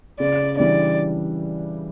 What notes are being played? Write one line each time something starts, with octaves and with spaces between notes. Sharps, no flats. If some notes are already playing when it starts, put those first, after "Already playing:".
C#3 D5
E3 G3 D4 D5